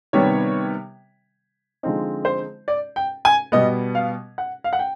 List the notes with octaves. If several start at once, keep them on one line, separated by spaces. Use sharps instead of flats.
C3 D#3 G3 B3 C#5
D3 F3 G#3 C4 D#4
C5
D5
G5
G#5
B2 G3 B3 D#5
F5
F#5
F5
F#5
G5